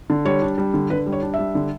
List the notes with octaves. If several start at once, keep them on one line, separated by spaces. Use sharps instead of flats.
D3
G3 C#5
D4
G3
D3
D3 B4
G3
C#5
D4
E5
G3
D3